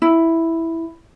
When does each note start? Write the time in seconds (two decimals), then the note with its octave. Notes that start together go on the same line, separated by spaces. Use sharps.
0.02 E4